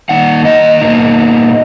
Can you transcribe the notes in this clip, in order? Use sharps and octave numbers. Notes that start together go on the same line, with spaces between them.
D#3 A#3 D#4 F#5
D#5
B2 A#3 D#4